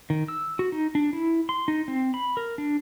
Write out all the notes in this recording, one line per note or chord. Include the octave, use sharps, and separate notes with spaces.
D#3
E6
F#4
D#4
D4
E4
C6
D#4
C4
B5
A#4
D4